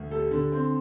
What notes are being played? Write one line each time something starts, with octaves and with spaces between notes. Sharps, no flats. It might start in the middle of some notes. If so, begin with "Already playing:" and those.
Already playing: D2
G3 A4
D3 A4
C4